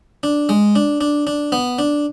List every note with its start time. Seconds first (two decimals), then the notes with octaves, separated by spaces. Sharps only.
0.23 D4
0.49 G#3
0.76 D4
1.01 D4
1.27 D4
1.52 B3
1.79 D4